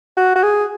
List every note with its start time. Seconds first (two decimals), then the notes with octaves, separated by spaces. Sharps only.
0.17 F#4
0.36 F#4
0.43 G#4